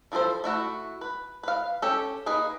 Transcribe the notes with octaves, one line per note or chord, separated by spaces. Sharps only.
E3 F3 E4 A4 C5
A3 E4 F#4
B4
B4 F5
C#4 G4 A4
A#3 D#4 G#4 B4